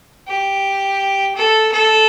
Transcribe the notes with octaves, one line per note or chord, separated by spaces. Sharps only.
G4
A4
A4